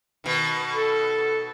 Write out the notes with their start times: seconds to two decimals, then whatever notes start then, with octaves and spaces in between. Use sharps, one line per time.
0.24 B2 D#3
0.73 A4